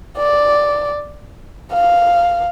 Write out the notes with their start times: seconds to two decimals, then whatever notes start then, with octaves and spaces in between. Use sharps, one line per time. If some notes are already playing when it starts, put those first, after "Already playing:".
0.17 D5
1.72 F5